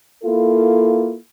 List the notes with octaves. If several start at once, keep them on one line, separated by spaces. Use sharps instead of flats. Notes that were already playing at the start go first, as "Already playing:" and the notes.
A#3 E4 F4 A4